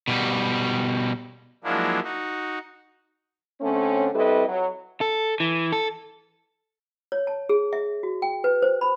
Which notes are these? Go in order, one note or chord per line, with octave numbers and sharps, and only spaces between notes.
B2 G3
F3 F#3 G#3 A#3 D4 E4
D#4 F#4
D3 A3 C4 C#4
G3 C4 E4 A4 B4 D#5
F#3
A4
E3
A4
C#5
A5
G#4
E5
F#4
G5
B4
C5
B5